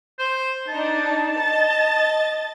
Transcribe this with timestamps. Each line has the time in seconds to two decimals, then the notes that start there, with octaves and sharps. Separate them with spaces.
0.19 C5
0.68 D4 D#4 A5
1.38 D#5 A6